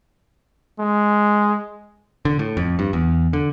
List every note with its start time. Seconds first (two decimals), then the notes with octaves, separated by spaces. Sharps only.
0.80 G#3
2.25 D3
2.39 A2
2.57 F2
2.79 G2
2.93 E2
3.33 D3